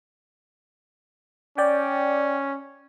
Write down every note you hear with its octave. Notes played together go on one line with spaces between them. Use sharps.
C#4 D5 G5